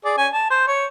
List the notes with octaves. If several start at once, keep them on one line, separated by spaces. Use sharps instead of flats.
G#4 D5
C#4 G#5
A5
C5
C#5